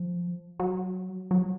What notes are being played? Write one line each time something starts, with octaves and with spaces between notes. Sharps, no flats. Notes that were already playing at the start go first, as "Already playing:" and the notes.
Already playing: F3
F#3
F#3